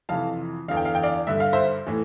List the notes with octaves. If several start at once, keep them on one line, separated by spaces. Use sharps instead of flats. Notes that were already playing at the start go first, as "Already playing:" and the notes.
F2 C3 E3 F5 A5
E2 D3 F5
G5
F5
G5
D5 F5
G2 D3 E5
F5
C5 E5
A2 E3